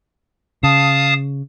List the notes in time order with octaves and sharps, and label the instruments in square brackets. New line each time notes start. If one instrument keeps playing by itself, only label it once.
[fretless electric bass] C#3 [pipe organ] F5 A5 D#6